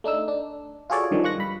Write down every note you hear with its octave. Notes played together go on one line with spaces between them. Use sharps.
A3 D4 D#4 E6
D4
F4 F#4 G#4 A4 C#5 D5
G2 D3 D#3 F3 G3
F4 C#6 F#6 A#6
G2 B5